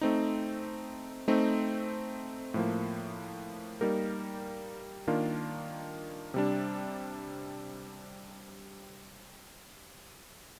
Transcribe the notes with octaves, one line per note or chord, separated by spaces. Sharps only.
A3 C4 D#4
A3 C4 D#4
A2 F3 A#3
G3 A#3 D#4 G4 A#4
D#3 A#3 D4 F4
C3 G3 D4